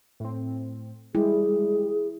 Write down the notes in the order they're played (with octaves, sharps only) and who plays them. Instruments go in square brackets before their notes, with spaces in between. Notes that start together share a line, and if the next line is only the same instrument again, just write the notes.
[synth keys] A2 C4
[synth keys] G3 G#3 [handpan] E4 [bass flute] G#4